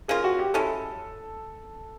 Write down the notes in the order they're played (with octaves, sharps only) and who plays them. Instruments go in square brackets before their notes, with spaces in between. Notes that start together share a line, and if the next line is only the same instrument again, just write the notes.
[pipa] A#3 C#4 F4 A#4 [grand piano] G#4
[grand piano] F#4
G4
[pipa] G#3 C#4 E4 [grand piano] A4